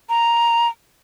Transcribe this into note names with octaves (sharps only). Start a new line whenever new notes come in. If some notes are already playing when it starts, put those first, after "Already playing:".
A#5